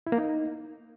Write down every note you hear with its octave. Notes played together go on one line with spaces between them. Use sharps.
E4
A#3
D#4